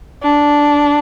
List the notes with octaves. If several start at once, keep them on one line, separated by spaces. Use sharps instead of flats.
D4